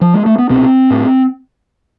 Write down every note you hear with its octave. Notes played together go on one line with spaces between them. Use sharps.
F3
G#3
A3
B3
C2 B2 C4
A2